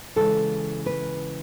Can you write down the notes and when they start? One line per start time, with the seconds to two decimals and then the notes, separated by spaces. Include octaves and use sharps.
0.16 C#3 E3 G#3 A4
0.86 B4